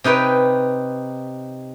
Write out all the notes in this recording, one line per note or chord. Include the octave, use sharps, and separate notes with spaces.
C3 D#4 B4 C#5 G5